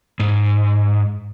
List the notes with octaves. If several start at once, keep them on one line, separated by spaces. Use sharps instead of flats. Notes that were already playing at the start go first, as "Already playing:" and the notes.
G#2